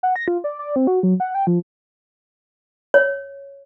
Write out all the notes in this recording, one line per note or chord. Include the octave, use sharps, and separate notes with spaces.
F#5
A#6
F4
D5
D5
C4
F#4
F#3
F#5
G5
F3
C#5